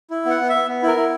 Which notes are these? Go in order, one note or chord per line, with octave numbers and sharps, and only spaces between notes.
E4
B3 F#5
B3
E5
B3
B3
E4 A#4
E4